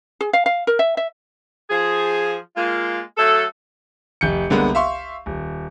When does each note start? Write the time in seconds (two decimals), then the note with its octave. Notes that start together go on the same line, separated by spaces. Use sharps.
0.21 G#4
0.33 F5
0.46 F5
0.67 A#4
0.79 E5
0.97 E5
1.70 F3 G#4
2.56 G#3 A#3 F4
3.18 F#3 A3 A4
4.21 F1 G6 C#7
4.50 C2 D3 G#3 A#3 B3
4.75 E5 F5 C6 C#6
5.26 D#1